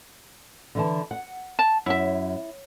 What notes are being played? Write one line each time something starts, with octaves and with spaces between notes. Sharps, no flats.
D3 E3 A5
F#5
A5
F#2 E4 E5